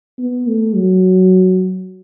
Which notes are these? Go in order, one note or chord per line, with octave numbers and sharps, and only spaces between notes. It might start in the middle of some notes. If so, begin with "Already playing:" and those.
B3
A3
F#3